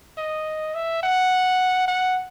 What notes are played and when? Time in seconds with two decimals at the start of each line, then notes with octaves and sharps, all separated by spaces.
0.18 D#5
0.75 E5
1.03 F#5
1.88 F#5